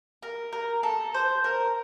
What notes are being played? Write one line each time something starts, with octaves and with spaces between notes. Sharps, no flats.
A#4
A#4
A4
C5
A#4